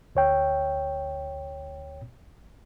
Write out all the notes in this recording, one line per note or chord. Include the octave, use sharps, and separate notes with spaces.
D2 C#5 G5